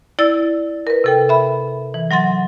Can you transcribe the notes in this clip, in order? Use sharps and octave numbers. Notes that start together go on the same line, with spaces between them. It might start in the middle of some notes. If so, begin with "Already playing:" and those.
E4 D5 E6 A6
A#4 B4
C3 A4 G5
E5 B5
E3
F#3 F#5 C6 A6